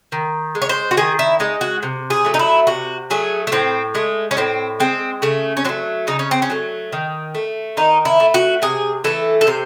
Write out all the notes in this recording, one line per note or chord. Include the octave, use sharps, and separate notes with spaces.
D#3
G#3
C#5
C5
F#4
D#3 G#4
E4
G#3 D#4
F#4
C3
G#4
F#3 A3
D#4
E4
C3 F#4
F#3 A3 G#4
A3
A2 C4
G#3 A3
C#4
A2 C4
G#3 C4
C#3 A3
C#4
F#3 A3 C4
C#3 D#4
C#4
C4
C#4
F#3 A3
D#3
A3
D#3 D#4
E4
A3
F#4
C3 G#4
E3 A3 A4
A4
C3 C5